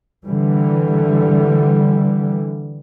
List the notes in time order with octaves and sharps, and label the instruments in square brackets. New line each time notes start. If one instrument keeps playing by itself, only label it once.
[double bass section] D3 E3 G3